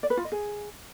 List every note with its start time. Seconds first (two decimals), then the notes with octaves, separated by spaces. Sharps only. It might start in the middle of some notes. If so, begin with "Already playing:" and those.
0.03 D5
0.10 B4
0.17 F4
0.25 D#5
0.32 G#4